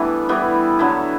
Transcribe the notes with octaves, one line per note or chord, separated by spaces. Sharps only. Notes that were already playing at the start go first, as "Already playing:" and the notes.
Already playing: E3 G3 A3 B3 D4 E4
E3 G3 B3 E4
D3 F#3 A3 E4